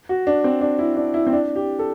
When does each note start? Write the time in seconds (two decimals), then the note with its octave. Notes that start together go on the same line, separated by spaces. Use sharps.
0.09 F#4
0.27 D4
0.44 C4
0.61 D4
0.79 E4
0.96 D4
1.14 E4
1.27 C4
1.33 D4
1.55 G4
1.79 A4